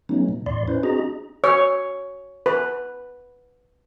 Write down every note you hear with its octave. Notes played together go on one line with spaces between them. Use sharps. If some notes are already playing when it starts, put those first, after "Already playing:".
F#3 A3 B3 C#4 D#4
A#2
E2 A2 D5 C6
C#4 E4 B4 C5
C4 D4 F#4 G#4 D#5 A#5
C#5
B4